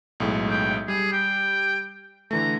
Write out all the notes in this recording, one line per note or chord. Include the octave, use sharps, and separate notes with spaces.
B1 A2 G#3
G5
G3 G#4
G5
D3 E3 A3 A#5